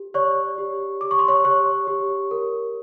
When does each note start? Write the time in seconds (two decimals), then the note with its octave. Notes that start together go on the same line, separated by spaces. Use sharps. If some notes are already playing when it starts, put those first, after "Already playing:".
Already playing: G4
0.14 C#5 D5 C#6
0.58 G4
1.01 G4 D6
1.11 C#6
1.19 C6
1.28 C#5 C#6
1.44 G4 C#5 C#6
1.87 G4
2.31 A#4